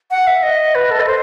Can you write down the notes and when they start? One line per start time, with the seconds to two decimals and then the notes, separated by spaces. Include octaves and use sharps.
0.11 F#5
0.27 E5
0.43 D#5
0.75 B4
0.91 A4
1.00 D#5
1.07 C5